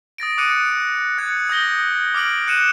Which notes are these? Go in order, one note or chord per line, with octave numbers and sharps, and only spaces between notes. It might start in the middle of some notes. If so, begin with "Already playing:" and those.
D#6 A6 A#6 D7
D6 D#6 F#6 C#7 D#7
F#6 G#6 C#7
D#6 G6 A#6 G7
D6 F6 D7 F#7
F#6 C#7 D#7 E7